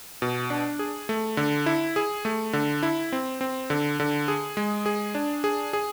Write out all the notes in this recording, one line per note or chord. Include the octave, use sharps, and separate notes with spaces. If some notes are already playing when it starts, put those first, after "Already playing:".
B2
D4
G#4
A3
D3
E4
G#4
A3
D3
E4
C4
C4
D3
D3
G#4
G#3
G#4
D4
G#4
G#4